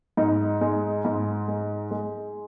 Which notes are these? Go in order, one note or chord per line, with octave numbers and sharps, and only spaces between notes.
G#2 D#4
G#3 D#4
G#2
G#3
G#3